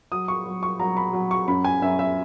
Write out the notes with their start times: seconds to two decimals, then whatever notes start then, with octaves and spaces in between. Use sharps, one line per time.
0.12 F#3 D#6
0.28 C#6
0.46 F#3
0.63 C#6
0.80 F#3 A#5
0.97 B5
1.13 F#3
1.31 C#6
1.48 F#2 B5
1.64 G#5
1.82 F#2 E5
1.99 E5